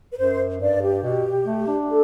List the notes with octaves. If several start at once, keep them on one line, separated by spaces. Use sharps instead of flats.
B4
F#2 C5
G2 D5
G4
B2
A3
D4
A4